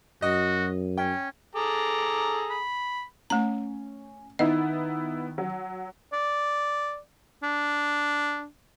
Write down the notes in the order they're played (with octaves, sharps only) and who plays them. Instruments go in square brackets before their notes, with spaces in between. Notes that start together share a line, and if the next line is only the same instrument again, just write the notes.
[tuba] F#2 [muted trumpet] F#4 [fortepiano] D#5
[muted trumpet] C#4 [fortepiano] G5
[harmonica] G#4 A4 A#5 [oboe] D6
[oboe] B5
[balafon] A3 A#5 [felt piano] C#4
[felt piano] D#3 [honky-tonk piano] B3 D#4 E4 [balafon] D#5
[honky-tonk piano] F#3
[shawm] D5
D4